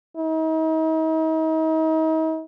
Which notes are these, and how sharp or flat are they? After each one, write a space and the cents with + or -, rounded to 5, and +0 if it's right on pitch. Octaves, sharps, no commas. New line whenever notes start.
D#4 +40